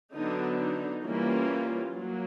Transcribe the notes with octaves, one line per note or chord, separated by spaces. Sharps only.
D3 F#3 B3 D4 D#4
D#4
E3 G3 A#3 C#4 F4
F#3 A#3